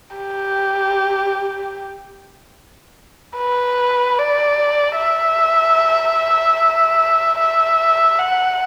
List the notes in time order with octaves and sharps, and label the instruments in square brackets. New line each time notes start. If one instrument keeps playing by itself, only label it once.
[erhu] G4
B4
D5
E5
E5
F#5